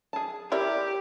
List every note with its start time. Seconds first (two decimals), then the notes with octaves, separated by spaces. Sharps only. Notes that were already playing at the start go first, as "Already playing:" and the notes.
0.13 G#4 A5
0.52 E4 G4 A#4 C#5 D5